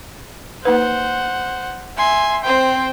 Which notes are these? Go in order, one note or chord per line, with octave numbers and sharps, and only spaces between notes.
A#3 D#4 B4 C5 F#5
E5 G#5 C6
C4 C5 G5